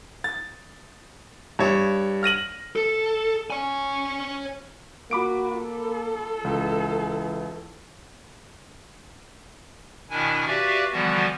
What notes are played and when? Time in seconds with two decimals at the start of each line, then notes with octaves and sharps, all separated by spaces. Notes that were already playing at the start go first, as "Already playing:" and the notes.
0.24 A6
1.59 G2 C#5
2.23 F6 A#6 D#7 F#7
2.76 A4
3.50 C#5 G#5
5.11 A#3 F#4 B5 D6 D7
5.61 A4
6.44 C#2 E3
10.10 B2 D#3 D4 E4 G#5
10.47 F#4 G4 B4 D5 E5 F5
10.92 D3 E3 F3 G3 B3 F#4